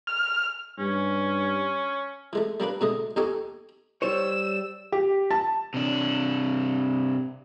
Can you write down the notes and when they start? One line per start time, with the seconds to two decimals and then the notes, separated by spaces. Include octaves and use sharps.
0.07 F6
0.79 G2 C#4
2.33 E3 G#3 A3
2.60 G3 A#3 D4 B4
2.81 B2 D3 G#3 A3 D#5
3.16 D#2 D#4 G4 A4 G#5 C#6
4.02 G3 C5 C#5 E6 E7
4.92 G4
5.31 A5
5.74 C3 D4